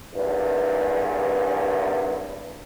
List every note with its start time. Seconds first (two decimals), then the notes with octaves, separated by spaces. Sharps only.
0.15 G#1 E2 G2